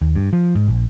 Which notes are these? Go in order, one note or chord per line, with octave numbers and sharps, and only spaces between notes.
D#2
G2
F3
G#2
A#1